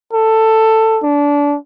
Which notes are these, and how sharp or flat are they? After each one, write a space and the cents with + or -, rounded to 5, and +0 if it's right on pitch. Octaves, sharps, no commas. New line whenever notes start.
A4 +10
D4 -25